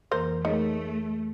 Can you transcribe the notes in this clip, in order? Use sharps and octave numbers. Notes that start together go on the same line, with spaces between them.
F2 E3 A#3 A#4 C5
A3 D#4 G#4 A#4 C#5